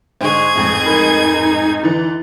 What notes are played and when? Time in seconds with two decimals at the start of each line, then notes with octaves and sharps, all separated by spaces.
0.21 G#2 D3 G#3 G#4 C5 C#6 G#6
0.56 A1 F2 G#2
0.86 D#4 A#4 B5
1.83 D3 E3 E4 A6